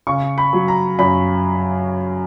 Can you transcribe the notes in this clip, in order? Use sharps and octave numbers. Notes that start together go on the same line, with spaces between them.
C#3 C#6
B5
F#3
A#5
F#2 B5